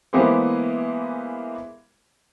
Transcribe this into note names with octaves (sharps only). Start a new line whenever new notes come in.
E3 G#3 A#3 B3 G4 C5